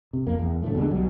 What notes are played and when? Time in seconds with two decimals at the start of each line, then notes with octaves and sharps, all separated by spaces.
0.13 C3
0.27 F2 A#3
0.39 E2
0.62 F#1 D2 A2 A3
0.75 D#2 B2 D3 G#3
0.90 B1 B2 F#3 G3